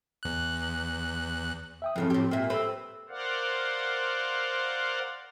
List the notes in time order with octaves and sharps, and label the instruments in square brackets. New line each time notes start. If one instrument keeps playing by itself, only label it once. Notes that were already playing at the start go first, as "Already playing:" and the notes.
[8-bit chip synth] E2 F#6
[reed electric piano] E5 G5 D#6
[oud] F#2 C#3 E3 [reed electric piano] F3 A4 [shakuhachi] C4
[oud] A2 G4
[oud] A#2 A#3 [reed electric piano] G4 E5 G5
[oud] C4 B4 [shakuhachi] A4
[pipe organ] A#4 C5 D5 F5 F#5